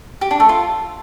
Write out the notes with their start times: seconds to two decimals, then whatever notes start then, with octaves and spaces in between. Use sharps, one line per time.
0.21 G4
0.31 D4
0.40 A3
0.49 F4